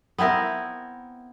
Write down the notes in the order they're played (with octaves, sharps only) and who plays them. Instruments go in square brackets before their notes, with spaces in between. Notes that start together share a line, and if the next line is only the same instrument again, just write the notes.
[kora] B3 C4 E4 A#4